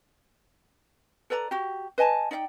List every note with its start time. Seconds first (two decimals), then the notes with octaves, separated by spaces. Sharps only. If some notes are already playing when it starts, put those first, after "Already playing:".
1.30 A4 B4 D5 A#5
1.51 F#4 G4
1.98 B4 D#5 G#5 A5
2.31 D#4 D5 F5 G5